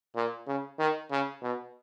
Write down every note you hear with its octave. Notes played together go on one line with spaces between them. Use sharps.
A#2
C#3
D#3
C#3
B2